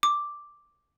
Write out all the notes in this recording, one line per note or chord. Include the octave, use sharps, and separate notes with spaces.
D6